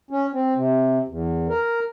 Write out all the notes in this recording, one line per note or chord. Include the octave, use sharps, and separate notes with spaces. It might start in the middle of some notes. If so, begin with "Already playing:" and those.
C#4
C4
C3
E2
A#4